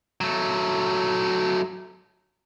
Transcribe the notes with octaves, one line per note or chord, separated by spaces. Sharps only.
F#3 A3